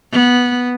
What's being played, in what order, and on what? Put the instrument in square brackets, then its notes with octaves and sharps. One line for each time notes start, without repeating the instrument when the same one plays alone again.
[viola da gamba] B3